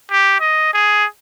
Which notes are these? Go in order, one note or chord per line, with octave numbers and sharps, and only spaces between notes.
G4
D#5
G#4